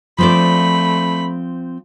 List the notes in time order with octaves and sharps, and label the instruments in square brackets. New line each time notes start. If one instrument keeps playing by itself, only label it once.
[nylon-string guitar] F3 C4 D5 [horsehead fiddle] A3 B5